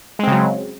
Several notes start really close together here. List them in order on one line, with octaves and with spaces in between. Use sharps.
G#3 C4 C#3 F#3